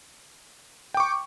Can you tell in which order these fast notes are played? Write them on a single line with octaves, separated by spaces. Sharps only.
G5 D6 C#6